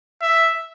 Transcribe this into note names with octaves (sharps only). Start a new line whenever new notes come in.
E5